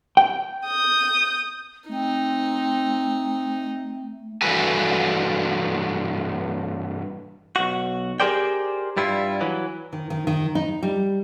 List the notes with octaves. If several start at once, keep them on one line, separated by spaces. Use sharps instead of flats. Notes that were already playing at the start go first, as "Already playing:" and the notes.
G5
D#6 G6
A3 C4 D#4
G2 E3 F#4 A4 B4 G#5
B1 F#4
G4 G#4 A#4 C5 D5 G5
G2 G3 E4 F4
E3 F#3
D#3
D#3
D#3
D#4
G3